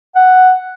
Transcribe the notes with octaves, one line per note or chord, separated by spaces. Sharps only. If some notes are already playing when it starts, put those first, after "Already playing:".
F#5